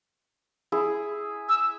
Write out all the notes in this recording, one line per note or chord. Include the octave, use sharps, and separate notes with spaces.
E4 G#4
E6